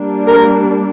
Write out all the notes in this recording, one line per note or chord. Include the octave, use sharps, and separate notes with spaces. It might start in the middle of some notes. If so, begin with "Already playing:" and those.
Already playing: G3 A#3 D4
A#4